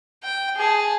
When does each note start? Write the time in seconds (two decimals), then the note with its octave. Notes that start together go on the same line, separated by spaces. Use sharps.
0.23 G5
0.57 G#4 A5